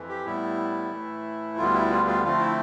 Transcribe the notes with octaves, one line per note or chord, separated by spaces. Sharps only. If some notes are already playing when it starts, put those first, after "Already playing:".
Already playing: F2 E3
G4
A2 G3 B3 E4
A2 E3 A3
D2 D3 G3 B3 F4
E4
F4
F4
D3 F3 A3 C4 F4
E4